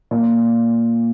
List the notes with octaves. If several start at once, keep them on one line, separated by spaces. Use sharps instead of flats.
A#2